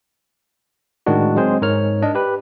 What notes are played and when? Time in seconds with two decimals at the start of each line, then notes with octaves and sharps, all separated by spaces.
1.06 A2 D#3 G#3 D4 F#4
1.36 F#3 G#3 C4 G#4 C5
1.62 G#2 A#4 C#5 F6
2.02 D4 D#5
2.15 G4 B4